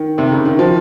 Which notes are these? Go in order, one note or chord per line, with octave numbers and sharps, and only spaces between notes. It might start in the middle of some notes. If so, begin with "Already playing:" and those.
Already playing: D#3
C3
C#3
D#3
F3